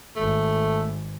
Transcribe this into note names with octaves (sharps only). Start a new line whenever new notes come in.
G#1 A3